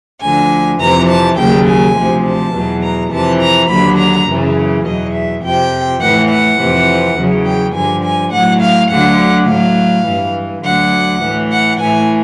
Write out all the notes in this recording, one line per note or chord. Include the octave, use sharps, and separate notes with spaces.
D2 D3 F3 G#5
F2 C3 E3 A#5
A5
D#2 C#3 F#3 G5
G#5
D2 C3 F3
A5
E2 B2 F#3
A#5
F2 C3 E3 A5
A#5
D#2 D3 F#3 B5
A#5
F#2 C#3 E3
E2 B2 F#3 D#5
E5
F2 C3 F3 G5
A2 E3 F#5
F#5
F2 C3 E3
E2 C#3 F#3
G5
G2 D3 F3 G#5
G#5
A2 F#3 F#5
F5
D2 D3 F#3 F#5
A2 F#3 F5
G2 E3
D2 D3 F#3 F#5
A2 E3
F#5
A2 E3 G#5